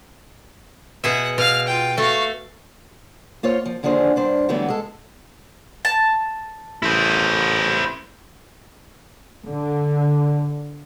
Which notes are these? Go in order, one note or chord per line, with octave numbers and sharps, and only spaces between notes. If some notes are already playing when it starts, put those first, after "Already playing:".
B2 G#4 E5 F#5
B2 F5 F6
F4 G5
A3 F#4 F5
A#3 F4 C5 C#5
F3
D#2 D3 F3 D4 G#4 C5
G2 D4 C5
D3 E3 F#3 G3 A3 B3
G#3 A4
A5
A1 E4 C5
D3